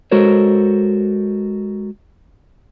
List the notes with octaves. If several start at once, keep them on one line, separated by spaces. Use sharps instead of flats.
G#3 F#4 A4 A#4 C5 C#5